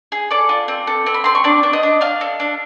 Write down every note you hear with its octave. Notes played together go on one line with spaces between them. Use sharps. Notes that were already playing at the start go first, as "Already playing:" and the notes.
G#4
A4 D5 D6
F4
C4
A4
C4
B5
C4 C6
C#6
D4 D5 D6
D4
D#5 D#6
D4
D4 F5 F6
A4
D4